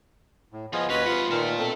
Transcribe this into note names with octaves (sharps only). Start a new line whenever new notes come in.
A2
F3 B3 F4 G#4 D#5
D#2 C#4 F#4 B4 D#5
C3 G#3 F4 F#5
A#2 D#3 A#4 E5 A5
B2 C4 A4